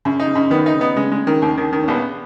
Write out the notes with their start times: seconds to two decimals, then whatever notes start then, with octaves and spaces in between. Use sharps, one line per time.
0.05 F#2 C#3
0.20 D#4
0.27 C#3
0.35 F#2
0.50 D#3 B3
0.66 D#4
0.74 C#3
0.81 B3
0.96 C#3 G#3
1.12 G#3
1.27 D#3
1.42 D#2
1.58 D#3
1.73 D#3
1.83 C#4
1.88 A#1 B3